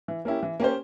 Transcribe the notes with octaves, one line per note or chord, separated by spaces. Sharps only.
E3
A#3 C#4 E4 G4
E3
A#3 C#4 G4 C5